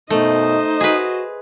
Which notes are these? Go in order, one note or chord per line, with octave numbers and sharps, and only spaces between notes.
F#2 B2 A3 B3 D#4 C5 D#5
F#4 G#4 B4